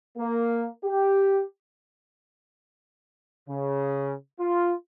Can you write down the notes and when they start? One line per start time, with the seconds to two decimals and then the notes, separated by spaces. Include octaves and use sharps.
0.18 A#3
0.83 G4
3.49 C#3
4.39 F4